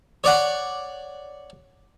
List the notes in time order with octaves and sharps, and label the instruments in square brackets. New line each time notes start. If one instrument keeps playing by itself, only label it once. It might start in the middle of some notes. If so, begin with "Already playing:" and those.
[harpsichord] C#5 D5 F#5